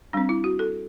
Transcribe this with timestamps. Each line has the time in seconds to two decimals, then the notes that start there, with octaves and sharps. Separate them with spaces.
0.13 G3 C4 D4
0.29 E4
0.44 F#4
0.59 A4